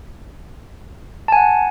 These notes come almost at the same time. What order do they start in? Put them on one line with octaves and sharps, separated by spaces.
A5 G#5 F#5